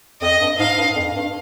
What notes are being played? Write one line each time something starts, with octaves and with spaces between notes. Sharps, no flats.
F2 D#5
G2
G#2 F5
G2
F2
G2